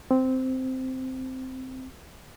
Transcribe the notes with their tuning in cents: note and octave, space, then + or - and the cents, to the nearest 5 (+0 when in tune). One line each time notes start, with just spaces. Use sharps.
C4 -10